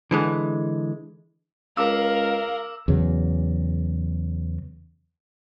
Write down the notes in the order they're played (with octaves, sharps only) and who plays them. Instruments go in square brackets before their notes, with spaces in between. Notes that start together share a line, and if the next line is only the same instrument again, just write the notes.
[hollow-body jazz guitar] D3 E3 G#3
[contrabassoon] C#2 [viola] A#4 [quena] F5 [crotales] D6 E6
[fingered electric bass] E2 C#3 F#3